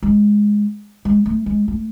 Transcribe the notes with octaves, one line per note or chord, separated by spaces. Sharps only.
G#3
G#3
A3
G#3
A3